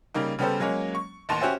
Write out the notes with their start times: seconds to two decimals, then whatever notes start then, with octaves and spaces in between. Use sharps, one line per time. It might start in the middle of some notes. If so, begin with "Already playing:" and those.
0.14 C#3 G3 A#3 D#4
0.39 C#3 G3 B3 G4 A4 C5
0.60 F#3 G#3 A#3 C#4
0.95 C#6
1.29 A1 D#2 A5 C6 F7
1.41 C#4 F#4 G4 C5 E5 G#5